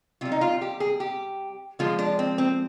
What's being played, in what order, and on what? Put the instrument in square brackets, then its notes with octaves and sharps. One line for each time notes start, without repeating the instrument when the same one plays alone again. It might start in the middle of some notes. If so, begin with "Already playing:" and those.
[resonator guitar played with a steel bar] C3 G3 F4
D#4
F4
G4
G#4
G4
D3 F3 G#3 F4
D4
C4
C4